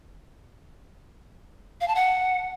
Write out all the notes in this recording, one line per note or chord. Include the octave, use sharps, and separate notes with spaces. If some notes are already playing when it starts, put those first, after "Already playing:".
F5
A5
F#5